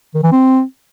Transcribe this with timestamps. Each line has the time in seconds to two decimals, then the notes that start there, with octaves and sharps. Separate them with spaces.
0.14 D#3
0.23 E3
0.32 C4